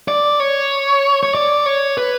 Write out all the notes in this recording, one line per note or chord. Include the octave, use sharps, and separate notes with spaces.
D5
C#5
C#5
D5
C#5
B4